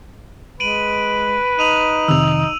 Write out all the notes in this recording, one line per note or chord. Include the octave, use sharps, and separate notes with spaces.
G#3 B4 D7 D#7 F#7
D#4 D#7 F7 F#7
F2 C3 D#3 E6 F7